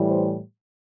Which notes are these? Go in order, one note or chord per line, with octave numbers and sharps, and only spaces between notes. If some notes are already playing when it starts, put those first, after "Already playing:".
Already playing: A2 E3 G3
C5